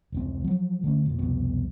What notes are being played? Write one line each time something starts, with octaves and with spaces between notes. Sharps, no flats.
F1 C#2 C4
F3 F#3
D3 A3 C#4
F1 A#2
C2 F2 B2